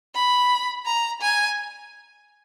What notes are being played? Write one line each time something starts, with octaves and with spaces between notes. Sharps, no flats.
B5
A#5
G#5